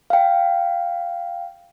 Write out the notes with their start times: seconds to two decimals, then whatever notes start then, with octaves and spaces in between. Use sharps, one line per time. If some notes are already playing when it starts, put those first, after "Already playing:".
0.10 F5 G5